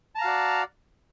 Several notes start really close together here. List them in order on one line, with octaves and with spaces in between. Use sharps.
A5 A#5 F5 F#4 D5